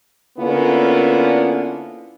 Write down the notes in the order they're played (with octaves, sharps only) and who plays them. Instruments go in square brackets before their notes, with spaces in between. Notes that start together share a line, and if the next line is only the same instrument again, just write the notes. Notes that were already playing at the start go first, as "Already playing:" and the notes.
[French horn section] D3 A#3 B3 C#4 E4 F4